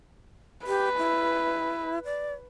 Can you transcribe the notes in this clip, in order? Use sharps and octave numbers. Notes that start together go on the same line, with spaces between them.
G4 B4
E4
D5